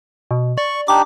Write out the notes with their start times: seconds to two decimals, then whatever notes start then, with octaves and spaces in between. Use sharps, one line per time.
0.31 B2
0.58 D5 C#6
0.88 D4 D#4 G4 D6